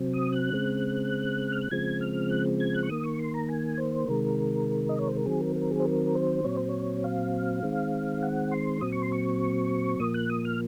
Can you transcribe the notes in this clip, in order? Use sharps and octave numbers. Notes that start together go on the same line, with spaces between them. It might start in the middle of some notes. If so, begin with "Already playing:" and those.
Already playing: C3 F#3 C4
D#6
F#6
C#3 G#3 C4
F6
F#6
C#3 F3 G#3 C4 G#6
F6
F#6
G#6
F#6
C#6
D#3 A#3 D#6
C#6
C6
A#5
G#5
C5
C3 D#3 G#3 A#4
D#5
C#5
C5
A#4
D#3 F#3 C4 G#4
A#4
A#4
G#4
C5
A#4
C5
A#2 F#3 C4 C#5
C5
C#5
F5
D#3 G#3 C4
F#5
C6
A#2 F#3 C4 D#6
C#6
C6
C#6
A#2 F3 A#3 D#6
F#6
D#6
F6